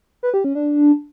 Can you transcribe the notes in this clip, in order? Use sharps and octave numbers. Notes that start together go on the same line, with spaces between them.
B4
G4
C#4
D4